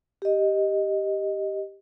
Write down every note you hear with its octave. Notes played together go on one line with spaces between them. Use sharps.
G4 D#5